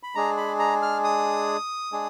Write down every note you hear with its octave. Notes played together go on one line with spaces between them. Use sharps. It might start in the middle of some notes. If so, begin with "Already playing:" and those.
B5
G#3 D4 G#4 A#5
B5
A#5
F6
D#6
G#3 D4 G#4